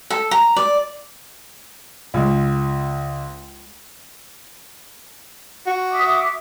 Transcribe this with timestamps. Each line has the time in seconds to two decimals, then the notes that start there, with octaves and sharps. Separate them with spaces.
0.10 A4
0.31 A#5
0.56 D5
2.14 C#2 G#3
5.67 F#4
5.90 E5 D6 D#6